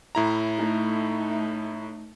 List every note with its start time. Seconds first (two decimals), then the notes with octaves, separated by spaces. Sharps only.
0.15 A2 E4 A#5
0.56 A3 D#4